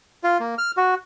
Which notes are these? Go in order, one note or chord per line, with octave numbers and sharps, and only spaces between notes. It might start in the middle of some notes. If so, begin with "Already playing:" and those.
F4
A#3
F6
F#4